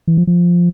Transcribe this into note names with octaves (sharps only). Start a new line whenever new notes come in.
E3
F3
F3